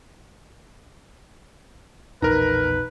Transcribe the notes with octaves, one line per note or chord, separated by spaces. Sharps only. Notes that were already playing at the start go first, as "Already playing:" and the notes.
A#1 E2 B2 D#4 A#4 B4 A#5